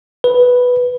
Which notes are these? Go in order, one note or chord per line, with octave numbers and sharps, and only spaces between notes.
B4